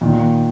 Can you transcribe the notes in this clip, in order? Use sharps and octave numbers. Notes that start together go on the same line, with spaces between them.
A#2 D#3